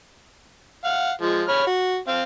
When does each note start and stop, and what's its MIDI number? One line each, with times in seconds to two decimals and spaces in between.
0.85 1.11 77
0.85 1.11 78
1.22 1.43 53
1.22 1.43 56
1.48 1.63 73
1.48 1.63 83
1.48 1.63 89
1.67 1.97 66
2.08 2.23 60
2.08 2.23 77